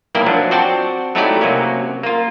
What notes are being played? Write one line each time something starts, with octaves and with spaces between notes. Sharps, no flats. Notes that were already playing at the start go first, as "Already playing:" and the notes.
B1 G3 A#3 E4 D5 G5
F3 F#3 D4
C4 F#4 D5 G5 A5
F#3 A3 D#4 E4 G4 D5
C3 F#3 A#3 C#4
A#3 F4